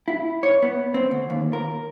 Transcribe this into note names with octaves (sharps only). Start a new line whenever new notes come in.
E4
C#5
B3
C4
D2
D#2
A#4